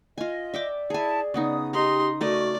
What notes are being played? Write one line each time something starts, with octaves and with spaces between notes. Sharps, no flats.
F4 D#5 G#5
D5 E5 G5 D6
E4 G#4 G#5 A5
C#3 B3 D#4 D#6
D#4 G4 A#5 C6 D#6
A3 F#4 A#4 D5 D#5